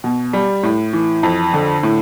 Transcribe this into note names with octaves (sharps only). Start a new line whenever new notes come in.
B2
G3
A2
E3
F2
D3
A2